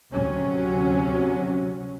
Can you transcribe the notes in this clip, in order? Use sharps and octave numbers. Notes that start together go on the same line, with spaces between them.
D2 C3 F#3 C#4